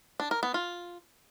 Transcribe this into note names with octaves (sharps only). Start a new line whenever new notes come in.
D4
A#4
B3
F4